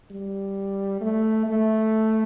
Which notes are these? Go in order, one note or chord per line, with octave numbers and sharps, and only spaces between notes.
G3
A3
A3